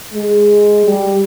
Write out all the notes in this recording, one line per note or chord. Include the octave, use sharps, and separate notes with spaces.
G#3
G3